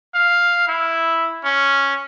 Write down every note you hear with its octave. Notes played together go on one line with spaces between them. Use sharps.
F5
E4
C#4